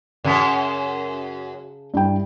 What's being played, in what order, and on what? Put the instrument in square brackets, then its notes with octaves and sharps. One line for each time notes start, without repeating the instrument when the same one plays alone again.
[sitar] F#2 C#4 [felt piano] C#3 A5 B6
[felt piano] G2 E4 G5